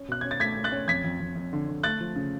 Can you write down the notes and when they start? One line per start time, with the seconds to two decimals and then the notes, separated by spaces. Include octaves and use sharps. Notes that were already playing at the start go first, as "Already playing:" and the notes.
Already playing: C#4
0.08 B2 F#6
0.21 C#4 G#6
0.31 A6
0.40 A3 G#6 B6
0.57 A3
0.64 F#6 A6
0.72 C#4
0.88 F2 G#6 B6
1.04 F2
1.20 F2
1.36 F2
1.53 D3
1.69 D3
1.83 A3 F#6 A6
2.01 F3
2.16 C#3